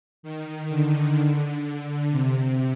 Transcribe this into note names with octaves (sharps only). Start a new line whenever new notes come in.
D#3
D3
C3